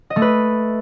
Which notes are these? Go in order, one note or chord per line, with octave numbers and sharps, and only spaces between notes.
D#5
A3
B4